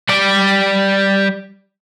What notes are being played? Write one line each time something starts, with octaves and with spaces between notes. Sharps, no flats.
G3 D5